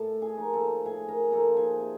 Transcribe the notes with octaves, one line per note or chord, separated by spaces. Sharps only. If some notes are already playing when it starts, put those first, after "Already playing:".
Already playing: A2 A4 A5
G#4 G#5
F3 A#3 D#4
A4 A5
A2 G#4 G#5
A#4 A#5
F3 A#3 D#4 A4 A5
G#4 G#5
C3